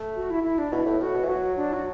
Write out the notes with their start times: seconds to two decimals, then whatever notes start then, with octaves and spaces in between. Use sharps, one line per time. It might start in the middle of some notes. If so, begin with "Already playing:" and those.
Already playing: A3
0.16 F#4
0.30 E4
0.44 E4
0.58 D4
0.72 B2 E4
0.86 A2
1.00 A2 F#4
1.14 B2
1.23 E3
1.28 F#3 F#4
1.57 D4
1.73 F#4